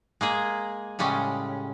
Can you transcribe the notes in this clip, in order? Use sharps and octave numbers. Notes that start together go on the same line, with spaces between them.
G#3 A#3 G#4
A2 C#3 G3 G#3 C#4